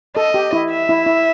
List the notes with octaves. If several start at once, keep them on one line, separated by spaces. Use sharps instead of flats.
A4 D#5
G4
E4
E5
E4
E4